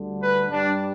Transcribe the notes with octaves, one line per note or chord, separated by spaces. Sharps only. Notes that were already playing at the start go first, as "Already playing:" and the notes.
Already playing: D2 D3 G3
B4
G2 G3 D4